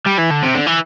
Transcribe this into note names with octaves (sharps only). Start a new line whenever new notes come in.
G3
E3
D3
C3
D3
E3